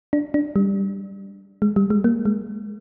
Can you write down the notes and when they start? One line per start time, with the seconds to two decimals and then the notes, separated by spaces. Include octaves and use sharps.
0.13 D4
0.34 D4
0.56 G3
1.62 G#3
1.76 G3
1.90 G#3
2.04 A#3
2.25 G#3